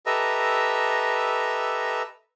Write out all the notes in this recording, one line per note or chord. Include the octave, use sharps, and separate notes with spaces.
G4 A4 B4 D#5 E5 A#5